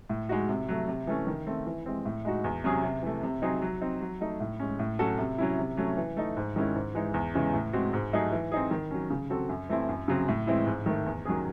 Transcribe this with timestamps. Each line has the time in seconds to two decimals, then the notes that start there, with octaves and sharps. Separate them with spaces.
0.09 A2
0.29 G#3 D#4 F#4
0.49 C3
0.68 F#3 A3
0.88 C3
1.07 E3 A3 C#4
1.27 D#3
1.46 A3 C4
1.66 E3
1.86 G#3 C4
2.05 A2
2.25 G#3 D#4 F#4
2.44 E2
2.64 C3 F#3 C#4 G#4
2.83 C3
3.03 E3 A3
3.23 C3
3.42 F#3 C4 D#4 G#4
3.62 F#3
3.81 C4 D#4
4.01 F#3
4.21 A3 D#4
4.40 A2
4.59 G#3 C#4
4.79 A2
4.99 F#3 C#4 F#4 A4
5.18 C3
5.38 F#3 C#4 E4
5.58 C3
5.77 F#3 A3 C#4
5.97 E3
6.17 A3 D#4
6.37 G#2
6.56 D#3 G#3 C#4 E4
6.75 G#2
6.95 E3 G#3 D#4 G#4
7.14 E2
7.34 C#3 E3 G#3 C#4
7.54 A2
7.73 G#3 C4 F#4
7.93 G#2
8.13 F#3 A3 D#4 G#4
8.32 E3
8.52 C4 D#4 G#4
8.71 D#3
8.91 F#3 C#4
9.10 C#3
9.30 F#3 C4 F#4 A4
9.49 F#2
9.69 E3 A3 C4 E4
9.89 F#2
10.08 C#3 F#3 C4
10.28 A2
10.47 E3 G#3 C4 E4
10.66 G#2
10.86 D#3 A3
11.06 E2
11.25 D#3 F#3 C#4 G#4